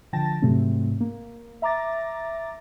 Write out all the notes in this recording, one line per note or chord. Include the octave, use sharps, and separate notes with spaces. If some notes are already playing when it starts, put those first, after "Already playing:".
D3 F3 G5 A5 A6 A#6
G#2 C3 F#3 A3 C4
A#3
E5 A#5 D6 A6 A#6